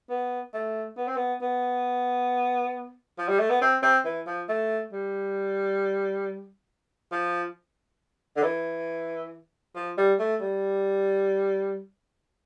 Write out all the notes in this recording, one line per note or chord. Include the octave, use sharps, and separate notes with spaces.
B3
A3
B3
C4
B3
B3
F3
G3
A3
B3
C4
C4
E3
F3
A3
G3
F3
D3
E3
F3
G3
A3
G3